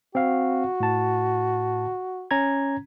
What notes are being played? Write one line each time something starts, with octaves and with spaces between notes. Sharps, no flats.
C4 F#4 F5
A2 A5
C#4 A#5 G#6